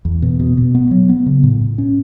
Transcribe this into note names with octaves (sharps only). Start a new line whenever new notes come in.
E2
B2
B2
B2
B3
F#3
B3
C#3
A2
A2
C#4